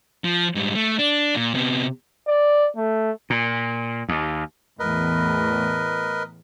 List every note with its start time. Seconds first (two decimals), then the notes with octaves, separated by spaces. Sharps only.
0.24 F3
0.55 G#2 G3
0.75 A3
0.99 D4
1.36 A#2
1.55 C3 B3
2.27 D5
2.77 A3
3.30 A#2
4.09 D#2
4.79 E2 A2 A#4 B4 D#5